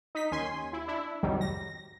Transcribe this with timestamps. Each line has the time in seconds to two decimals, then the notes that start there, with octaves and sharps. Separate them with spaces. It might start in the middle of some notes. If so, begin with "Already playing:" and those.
0.15 D#4 B6
0.31 D#2 C#4 G#5 C6
0.73 E4
0.88 D4 E4
1.23 C2 F2 G#2 D#3 F#3 G3
1.41 A#6